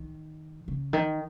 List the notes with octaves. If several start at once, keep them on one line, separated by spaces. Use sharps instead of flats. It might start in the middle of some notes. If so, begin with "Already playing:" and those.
Already playing: D#3
C#3
D#3